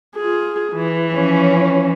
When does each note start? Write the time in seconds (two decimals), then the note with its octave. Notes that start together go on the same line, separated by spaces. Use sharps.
0.16 F4 G#4
0.73 E3
1.11 F3 C#4